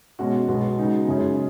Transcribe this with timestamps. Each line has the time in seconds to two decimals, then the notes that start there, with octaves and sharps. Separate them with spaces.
0.19 B2 G#3 C#4 F#4
0.48 B1 B2 G#3 B3 F#4
0.78 C#3 G#3 D#4 F#4
1.08 F#2 C#3 G#3 C#4 G#4